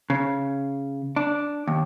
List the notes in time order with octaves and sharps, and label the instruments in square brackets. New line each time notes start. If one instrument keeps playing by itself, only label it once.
[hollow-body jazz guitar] C#3
D4
D#2